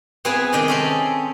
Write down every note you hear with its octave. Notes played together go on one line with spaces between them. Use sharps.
B3 C4 E4 G#4 B4 G#5
C3 D#3 G4 D#5
C4 C#4 A4